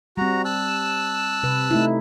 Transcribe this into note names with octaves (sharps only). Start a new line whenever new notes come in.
G3 C4 F#4 A#5
A5 E6 F#6
C3 B4
A3 D#4 E4